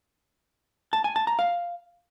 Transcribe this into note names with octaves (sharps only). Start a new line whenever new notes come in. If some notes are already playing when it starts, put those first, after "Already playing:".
A5
G#5
A5
A#5
F5